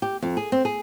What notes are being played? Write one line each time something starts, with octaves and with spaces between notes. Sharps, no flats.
G4
F2
G#4
C4
G#4